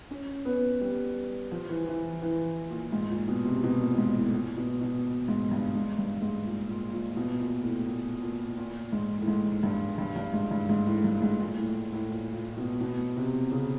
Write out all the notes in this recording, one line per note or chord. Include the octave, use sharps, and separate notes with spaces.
C#4
B3
G3
F3
E3
E3
E3
A#2
G#2
A#2
B2
C3
B2
A#2
G#2
A2
A#2
B2
B2
G#2
G2
G#2
G2
G#2
A#2
A#2
A#2
B2
A#2
A2
A#2
A#2
A#2
G#2
A2
G#2
G2
G2
G2
G#2
G2
G#2
A2
G2
G#2
A#2
A2
A2
A#2
A#2
B2
B2
C3
C#3